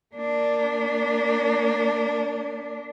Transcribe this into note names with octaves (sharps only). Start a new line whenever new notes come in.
A#3 D4